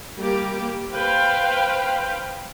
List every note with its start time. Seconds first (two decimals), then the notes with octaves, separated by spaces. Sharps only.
0.18 G3 A#3 G4
0.90 B4 C5 F5 G5